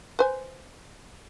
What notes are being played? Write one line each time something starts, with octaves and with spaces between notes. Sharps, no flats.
B4 C5 G#5